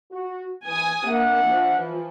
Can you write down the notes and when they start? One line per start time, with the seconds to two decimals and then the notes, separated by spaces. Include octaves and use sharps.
0.11 F#4
0.65 E3 G#5 D#6
1.07 A#3 D4 E5 F#5
1.45 F3
1.77 E3